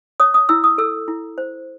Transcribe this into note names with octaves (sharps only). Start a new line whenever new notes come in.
C#5 D#6
D#6
E4 E6
D#6
A4 E6
E4
C5